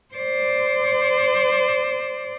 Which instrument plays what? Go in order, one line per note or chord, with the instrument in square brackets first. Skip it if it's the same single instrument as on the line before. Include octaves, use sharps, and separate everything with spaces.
[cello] C5 D5